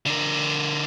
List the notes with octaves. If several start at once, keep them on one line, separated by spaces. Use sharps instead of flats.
D3 A#4